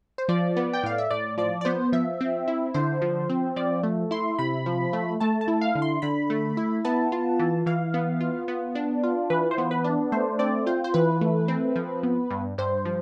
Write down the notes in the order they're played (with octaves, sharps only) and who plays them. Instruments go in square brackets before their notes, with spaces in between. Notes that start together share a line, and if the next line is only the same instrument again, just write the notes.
[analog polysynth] C5
F3 D5
B3
G5
A2 F5
E5
A2 D5
F3 D5
D5
B3 C5
F3 E5
C4
E4
D3 C5
F3
C4
F3 D5
A3
E4 C6
C3 B5
F3
A3
A3 A5
A5
E4
F5
D3
C6
D3 B5
A3
E4
B3 A5
F4
E3
E3 F5
B3
F4
B3
D4
F4
E3 B4
C5
B3
B4
D4
A3 C5
C4 D5
F4 C5
C5
E3 B4
A3
C4
F3
B3
G2
G2 C5
F3